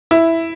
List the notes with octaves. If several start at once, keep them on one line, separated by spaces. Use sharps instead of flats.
E4